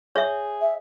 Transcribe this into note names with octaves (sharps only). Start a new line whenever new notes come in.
G#4 C#5 E5
E5